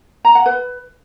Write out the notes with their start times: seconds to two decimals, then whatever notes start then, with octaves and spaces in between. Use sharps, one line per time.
0.25 A#5
0.35 F#5
0.46 B4